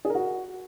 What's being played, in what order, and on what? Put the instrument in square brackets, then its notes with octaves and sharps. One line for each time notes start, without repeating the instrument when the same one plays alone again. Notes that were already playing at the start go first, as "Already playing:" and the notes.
[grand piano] G#4
A#4
F#4